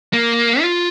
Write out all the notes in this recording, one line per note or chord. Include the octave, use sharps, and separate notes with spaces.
A#3
F4